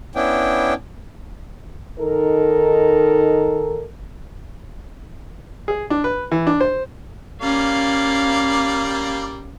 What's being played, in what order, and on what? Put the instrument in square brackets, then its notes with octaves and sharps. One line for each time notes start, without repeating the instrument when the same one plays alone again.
[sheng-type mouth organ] B3 C#4 D4 E4 G5
[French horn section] D#3 D#4 A4 A#4
[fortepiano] G#4
D4
B4
E3
D4
C5
[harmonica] G3 A#3 D5 [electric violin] C#4 F5